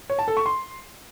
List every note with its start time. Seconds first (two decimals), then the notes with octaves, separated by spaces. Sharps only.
0.10 C#5
0.19 A5
0.28 A4
0.37 C#6
0.46 C6